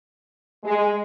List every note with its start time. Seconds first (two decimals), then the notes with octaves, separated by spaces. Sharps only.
0.64 G#3